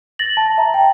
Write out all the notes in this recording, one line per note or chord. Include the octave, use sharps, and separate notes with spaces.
A6 A#6 F#7
A5
E5 A#5
G5